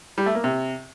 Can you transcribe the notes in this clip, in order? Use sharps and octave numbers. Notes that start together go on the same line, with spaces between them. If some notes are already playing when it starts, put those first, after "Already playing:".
G3
A3
A#3
C3